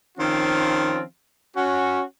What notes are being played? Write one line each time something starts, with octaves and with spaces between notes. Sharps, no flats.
D#3 F3 C4 C#4 F4
C#4 F#4